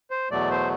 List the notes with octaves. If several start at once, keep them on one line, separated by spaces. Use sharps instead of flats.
C5
E2 B2 F#3 A3 D5
C5